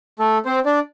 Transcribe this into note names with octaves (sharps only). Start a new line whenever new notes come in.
A3 A4
C4 C5
D4 D5